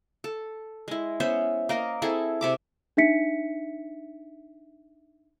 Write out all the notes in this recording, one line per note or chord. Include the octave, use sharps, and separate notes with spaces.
A4
G#3 E4
B3 C#4 C5 E5
A#3 A#4 D#5
C4 E4 G#4 A4
C3 E5 D6
D4 D#4 E5 B6 C#7